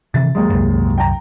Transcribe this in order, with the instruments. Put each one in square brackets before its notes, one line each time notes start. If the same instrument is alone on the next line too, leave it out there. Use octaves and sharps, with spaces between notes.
[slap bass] C3 D#3 E3 [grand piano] E5 A6
[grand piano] D#2 G#3 [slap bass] F#3
[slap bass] C2 F#2
[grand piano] G5 A#5